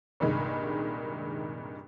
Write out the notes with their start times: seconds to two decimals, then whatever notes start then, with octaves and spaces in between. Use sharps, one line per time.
0.20 C2 G2 A#2 D#3 G#3